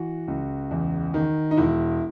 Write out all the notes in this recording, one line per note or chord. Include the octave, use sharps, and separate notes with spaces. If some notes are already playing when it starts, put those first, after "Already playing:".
Already playing: E3 F#4
C#2
E2
D#3
D#4
E1 E4